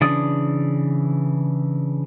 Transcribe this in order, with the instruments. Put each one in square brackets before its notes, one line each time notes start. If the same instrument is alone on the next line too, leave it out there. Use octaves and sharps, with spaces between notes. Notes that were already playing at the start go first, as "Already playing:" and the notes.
[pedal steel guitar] C#3 E3 D4 D5 D#6